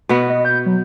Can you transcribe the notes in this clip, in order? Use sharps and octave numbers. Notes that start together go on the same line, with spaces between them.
B2 B3 F#4
D#5
G6
F#3